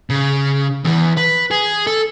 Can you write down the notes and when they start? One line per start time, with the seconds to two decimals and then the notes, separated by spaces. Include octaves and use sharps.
0.10 C#3
0.84 E2 E3
1.17 B4
1.51 G#4
1.87 A4